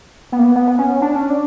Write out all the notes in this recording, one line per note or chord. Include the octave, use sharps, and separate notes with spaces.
B3
A#3
B3
B3
B3
C#4
D4
C#4
D4